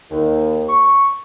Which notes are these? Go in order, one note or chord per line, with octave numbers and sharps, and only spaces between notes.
D#2
C#6